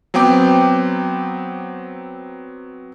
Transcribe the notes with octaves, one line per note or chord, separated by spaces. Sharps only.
F#3 B3 C4 G5 D6